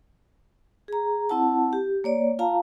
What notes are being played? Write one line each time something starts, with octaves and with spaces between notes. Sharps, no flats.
G#4 A#5
C4 E4 F#5 A5
G4
A#3 C#5 D5
F4 F5 A5 A#5